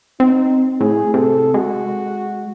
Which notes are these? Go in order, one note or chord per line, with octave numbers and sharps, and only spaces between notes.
C4 D#4
A2 G#4
C3 A4
G#3 F#4